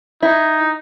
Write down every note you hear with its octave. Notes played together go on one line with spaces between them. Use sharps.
D#4 E4